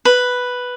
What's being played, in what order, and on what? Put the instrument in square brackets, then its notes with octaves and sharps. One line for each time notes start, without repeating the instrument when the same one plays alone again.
[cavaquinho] B4